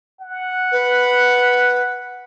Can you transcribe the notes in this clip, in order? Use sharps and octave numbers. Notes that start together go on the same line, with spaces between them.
F#5
B4